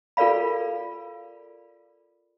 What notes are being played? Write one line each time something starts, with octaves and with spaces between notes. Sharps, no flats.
F4 A4 A#4 D5 F5 B5